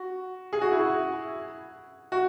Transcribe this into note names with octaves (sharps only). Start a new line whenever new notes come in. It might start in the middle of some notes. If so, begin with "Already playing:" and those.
Already playing: F#4
G#4
F#4
E4
F#4
F#4